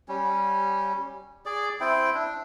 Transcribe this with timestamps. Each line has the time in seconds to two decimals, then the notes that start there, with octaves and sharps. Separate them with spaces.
0.08 G3 C#4
1.45 G#4 D5
1.80 C4 E4 G5
2.14 D4